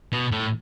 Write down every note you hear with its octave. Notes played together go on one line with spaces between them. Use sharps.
B2
A2